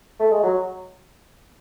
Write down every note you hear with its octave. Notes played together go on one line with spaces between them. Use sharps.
A3
G#3
F#3